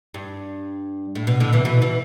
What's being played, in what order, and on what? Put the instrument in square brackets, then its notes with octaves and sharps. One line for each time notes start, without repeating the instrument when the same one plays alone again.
[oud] G2
A2
B2
A2 D3
B2 E3
B2 E3
B2 E3